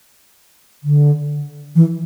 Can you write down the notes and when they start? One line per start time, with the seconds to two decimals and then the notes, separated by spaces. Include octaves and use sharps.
0.83 D3
1.75 E3